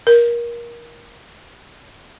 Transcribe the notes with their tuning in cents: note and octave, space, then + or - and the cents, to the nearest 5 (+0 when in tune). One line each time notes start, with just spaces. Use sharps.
A#4 +25